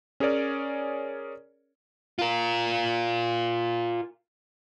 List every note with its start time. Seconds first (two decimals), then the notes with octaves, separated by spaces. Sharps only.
0.20 C#4 G#4 A#4 C#5 D5
2.19 F4 A#4